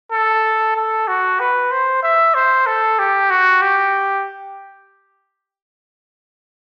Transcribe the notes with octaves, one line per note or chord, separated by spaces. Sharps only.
A4
A4
F#4
B4
C5
E5
C5
A4
G4
F#4
G4